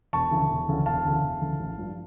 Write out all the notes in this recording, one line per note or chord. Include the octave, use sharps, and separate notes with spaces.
E1 A5 C#6
D2 C#3 E3
E1
D2 C#3 E3
E1 F5 A5
D2 C#3 E3
E1
D2 C#3 E3
A1
G2 F3